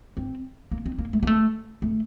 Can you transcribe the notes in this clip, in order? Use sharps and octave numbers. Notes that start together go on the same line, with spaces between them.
C4
A#3
C4
A#3
A3
A#3
A3
A3